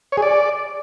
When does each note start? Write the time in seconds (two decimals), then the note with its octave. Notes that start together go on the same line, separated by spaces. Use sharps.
0.12 C#5
0.17 G#4
0.22 D5